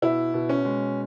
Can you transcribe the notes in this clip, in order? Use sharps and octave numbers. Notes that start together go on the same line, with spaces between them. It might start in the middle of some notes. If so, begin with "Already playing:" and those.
B2 E4
B2
C#4
G#3